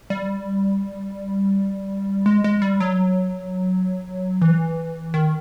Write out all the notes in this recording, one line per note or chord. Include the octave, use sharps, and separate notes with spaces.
G3
G#3
G#3
G3
F#3
E3
D#3